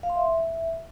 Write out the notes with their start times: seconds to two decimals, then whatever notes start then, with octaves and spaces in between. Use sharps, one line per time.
0.03 F5
0.10 C6
0.16 E5